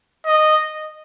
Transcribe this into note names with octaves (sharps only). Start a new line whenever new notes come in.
D#5